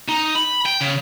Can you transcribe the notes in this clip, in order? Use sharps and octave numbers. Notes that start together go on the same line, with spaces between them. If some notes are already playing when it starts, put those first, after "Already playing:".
D#4
B5
G5
C#3